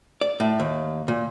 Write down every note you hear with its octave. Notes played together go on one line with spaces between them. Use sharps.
D5
A2
D#2
A#2